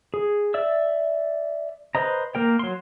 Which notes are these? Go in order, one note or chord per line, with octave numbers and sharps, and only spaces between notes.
G#4
D5 E5 E6
B4 C5 D#5 A#5
A#3 A#4 G5
F#3 C6